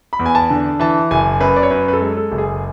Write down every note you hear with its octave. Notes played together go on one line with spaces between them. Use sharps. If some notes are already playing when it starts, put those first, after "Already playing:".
B5
E2
G#5
A5
D3
E3 A5
F#1 G#5
F#2 B4
D5
C#5
F#2 B4
B4
A4
G#3
A4
F#1
G#4